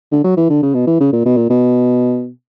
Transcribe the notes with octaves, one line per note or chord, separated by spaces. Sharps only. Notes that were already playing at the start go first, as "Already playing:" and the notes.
D3
F#3
E3
D3
C#3
B2
E3
C#3
A#2
B2
A#2
B2